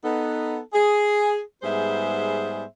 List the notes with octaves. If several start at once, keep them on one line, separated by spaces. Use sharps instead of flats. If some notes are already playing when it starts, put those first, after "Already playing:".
B3 D#4 A4
G#4
G#2 G3 B3 G#4 C5 E5